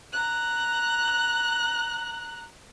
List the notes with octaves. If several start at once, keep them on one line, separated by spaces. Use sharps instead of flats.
A#5 F#6